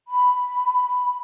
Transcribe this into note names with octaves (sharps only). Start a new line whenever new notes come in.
B5